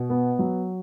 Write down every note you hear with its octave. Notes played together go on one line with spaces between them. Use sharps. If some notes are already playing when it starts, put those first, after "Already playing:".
Already playing: B2
B3
F#3